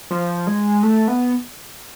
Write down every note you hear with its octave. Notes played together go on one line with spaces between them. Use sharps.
F3
G#3
A3
B3